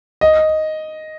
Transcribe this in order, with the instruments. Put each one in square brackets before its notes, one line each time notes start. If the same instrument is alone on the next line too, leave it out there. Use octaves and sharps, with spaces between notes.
[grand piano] D#5